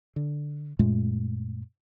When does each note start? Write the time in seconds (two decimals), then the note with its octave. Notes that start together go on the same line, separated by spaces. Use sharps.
0.16 D3
0.79 F#2 A#2 G#3 A3